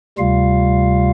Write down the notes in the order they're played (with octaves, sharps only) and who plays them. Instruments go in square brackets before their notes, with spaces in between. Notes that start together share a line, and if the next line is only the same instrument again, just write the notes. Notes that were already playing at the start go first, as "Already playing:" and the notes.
[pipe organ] D2 C3 G3 F4 F5